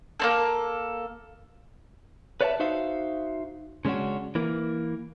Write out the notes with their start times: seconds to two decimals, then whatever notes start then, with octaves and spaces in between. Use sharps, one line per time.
0.20 A#3 C4 A4
2.41 B4 C#5 D5 E5 F5 A5
2.60 D#4 F#4 C5 E5 F5
3.85 C#3 G#3 C#4 D4 F#4
4.35 E3 A#3